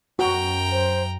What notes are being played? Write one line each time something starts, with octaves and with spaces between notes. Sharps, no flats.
F#2 F#4 G5 A#5
C5